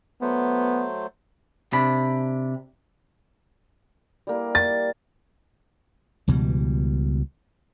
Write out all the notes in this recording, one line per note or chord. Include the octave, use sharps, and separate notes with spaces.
F#3 A3 B3 C5
C3 D4 B5
G3 A#3 E4
A6
C#2 B2 E3 G3